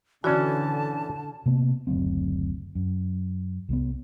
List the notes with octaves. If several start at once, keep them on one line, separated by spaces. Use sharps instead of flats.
D3 E3 C#4 F#4 D5 A5
C3 A#3 B3
F#1 D2 F#3 C4
F#2
C2 G#3 B3